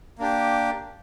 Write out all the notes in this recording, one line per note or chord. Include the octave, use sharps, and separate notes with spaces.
A#3 D4 G4